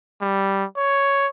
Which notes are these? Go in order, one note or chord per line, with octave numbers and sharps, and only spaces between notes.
G3
C#5